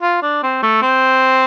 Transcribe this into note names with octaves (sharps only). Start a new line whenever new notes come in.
F4
D4
C4
A3
C4